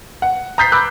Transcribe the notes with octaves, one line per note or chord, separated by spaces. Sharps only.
F#5
A#5 D#6 G6 A6 B6 C7
B5 D6 E6 F#6